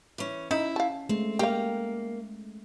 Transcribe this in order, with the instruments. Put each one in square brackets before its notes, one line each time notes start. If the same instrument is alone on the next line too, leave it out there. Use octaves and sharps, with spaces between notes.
[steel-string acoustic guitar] E3 C#4
[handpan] C#4 [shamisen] D#4 [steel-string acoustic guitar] E4 E5
[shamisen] F5 A5
[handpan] G#3 A3 [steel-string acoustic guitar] C4
[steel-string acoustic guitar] A#3 [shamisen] G4 F5